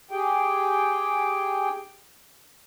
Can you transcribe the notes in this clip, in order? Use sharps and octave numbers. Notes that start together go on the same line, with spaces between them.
G4 G#4 G5